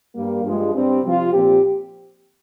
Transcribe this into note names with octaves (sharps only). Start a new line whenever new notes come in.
G2 G3 A#3
G2 F3 G#3
G2 G3 C4
C3 F3 C4 F4
A#2 F3 C4 G4